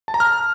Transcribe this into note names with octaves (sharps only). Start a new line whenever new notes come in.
A5
A#5
F6